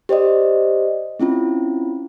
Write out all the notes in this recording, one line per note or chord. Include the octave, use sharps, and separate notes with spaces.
G4 C5 D5 D#5
C4 C#4 E4 F4